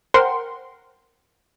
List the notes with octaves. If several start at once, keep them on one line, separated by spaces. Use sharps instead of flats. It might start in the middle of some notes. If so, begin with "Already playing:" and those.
A#4 C5 F#5 G5 C6